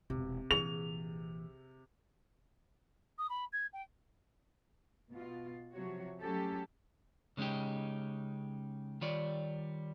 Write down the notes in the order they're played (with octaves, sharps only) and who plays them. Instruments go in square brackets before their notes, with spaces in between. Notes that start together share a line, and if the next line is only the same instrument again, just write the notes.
[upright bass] E1 [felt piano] C3
[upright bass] A#1 E3 [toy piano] G#4 [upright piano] F7
[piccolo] D#6
B5
G#6
G5
[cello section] B2 F4
C3 F3 F#3 F#4 C#5
F#3 A3 C#4 G4 A4
[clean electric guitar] C#3 G#3 C#4 D#4 G4
D#3 G3 F4 C#5 D5